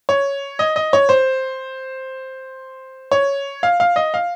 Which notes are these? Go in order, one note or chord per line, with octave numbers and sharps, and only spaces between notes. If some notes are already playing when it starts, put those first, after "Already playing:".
C#5
D#5
D#5
C#5
C5
C#5
F5
F5
D#5
F5